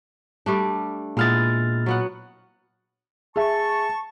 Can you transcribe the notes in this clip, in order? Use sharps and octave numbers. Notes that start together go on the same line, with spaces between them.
G3 A3 D4
A#2 G#3 B3 E4 F6 A6
F#3 B3 F#5
G#4 E5 A5 C#6